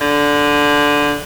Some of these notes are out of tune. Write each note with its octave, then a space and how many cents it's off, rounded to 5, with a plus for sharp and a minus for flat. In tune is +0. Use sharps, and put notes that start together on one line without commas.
D3 -10